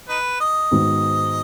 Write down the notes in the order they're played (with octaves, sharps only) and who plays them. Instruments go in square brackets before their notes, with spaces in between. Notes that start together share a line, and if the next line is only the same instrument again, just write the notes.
[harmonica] D#4 B4
D#5
[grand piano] G#2 D#3 B3 F#4